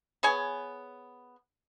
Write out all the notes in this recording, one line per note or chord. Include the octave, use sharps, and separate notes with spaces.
B3 G#4 C#5 G#5